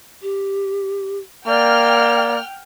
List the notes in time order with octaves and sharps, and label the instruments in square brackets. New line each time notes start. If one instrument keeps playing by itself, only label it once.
[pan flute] G4
[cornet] A#3 [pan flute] D5 [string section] F#5 G5 F6